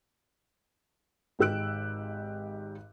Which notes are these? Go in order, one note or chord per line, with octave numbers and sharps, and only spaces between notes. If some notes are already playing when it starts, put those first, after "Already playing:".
G#1 G#2 G4 E6 F#6 D7